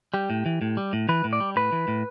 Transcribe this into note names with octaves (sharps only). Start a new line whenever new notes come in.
G3 G4
A2
E3
A2
G3
A2
E3 B4
A2
D5
G3
A2 B4
E3
A2